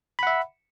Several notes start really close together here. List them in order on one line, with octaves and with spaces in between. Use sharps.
B5 F#5 E5